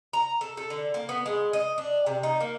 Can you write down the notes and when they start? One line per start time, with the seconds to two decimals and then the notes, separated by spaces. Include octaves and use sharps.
0.13 A#5
0.41 A4
0.57 A4
0.70 D3
0.94 A#3
1.09 B3
1.26 G#3
1.53 D#5
1.78 D4
2.06 C3
2.23 D#4
2.41 A#3